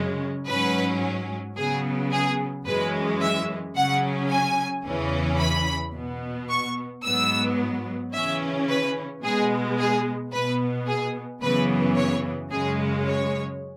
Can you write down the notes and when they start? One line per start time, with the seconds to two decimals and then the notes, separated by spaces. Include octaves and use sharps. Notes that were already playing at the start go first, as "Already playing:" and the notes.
Already playing: F#2 C#3 G#3 C#4
0.47 G#2 F#3 C#4 B4
1.56 C#3 F#3 B3 G#4
2.12 G#4
2.66 F#2 E3 G#3 C#4 B4
3.22 E5
3.76 C#3 F#3 C#4 F#5
4.30 G#5
4.85 E2 C#3 E3 C#4
5.40 B5
5.95 B2 B3
6.49 C#6
7.04 G#2 F#3 B3 E6
8.14 C#3 E3 C#4 E5
8.69 B4
9.23 B2 G#3 B3 G#4
9.78 G#4
10.32 B2 B3 B4
10.87 G#4
11.42 F#2 C#3 E3 B3 B4
11.96 C#5
12.51 F#2 C#3 G#3 C#4 G#4
13.06 C#5